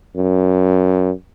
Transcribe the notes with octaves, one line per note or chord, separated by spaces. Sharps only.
F#2